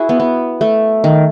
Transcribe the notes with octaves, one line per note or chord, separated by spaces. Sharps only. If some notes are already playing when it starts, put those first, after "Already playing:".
Already playing: E4 F#4 G#4 B4
B3
B3
A3
D#3